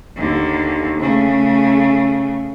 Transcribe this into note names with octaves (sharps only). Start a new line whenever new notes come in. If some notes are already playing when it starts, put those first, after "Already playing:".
D#2 D3
C#3 A3